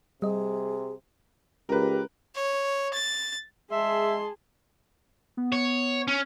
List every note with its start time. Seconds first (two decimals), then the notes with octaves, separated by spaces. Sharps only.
0.22 C3 G3 G#4 D#5
1.69 C#2 G4 A#4 B4
2.35 C#5
2.94 A6
3.71 G#3 G#4 E5 A5 C6
5.37 B3
5.52 C#5
6.08 C#4